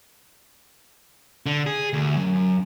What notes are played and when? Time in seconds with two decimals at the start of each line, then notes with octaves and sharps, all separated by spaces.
1.46 D3
1.66 G#4
1.93 D2
2.17 F#2